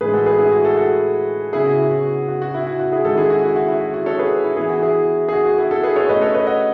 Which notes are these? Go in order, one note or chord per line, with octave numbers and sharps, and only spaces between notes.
A2 E3 G#3 G#4 B4
F#4 A4
G#4 B4
E4 G#4
F#4
F#4 A4
F#4 A4
C#3 F#3 B3 E4 G#4
F#4
E4
F#4
F#4
F#4
E4
F#4
F#4
E4 G#4
D#3 G#3 C#4 F#4 A4
E4 G#4
F#4
E4
F#4
E4
F#4
F#4
A4 C#5
G#4 B4
E4
E3 B3 E4 G#4
F#4
E4 G#4
G#4
F#4
F#4
E4 G#4
F#4 A4
G#4 B4
A4 C#5
B2 A3 C#4 B4 D#5
A4 C#5
B4 D#5
D#5 F#5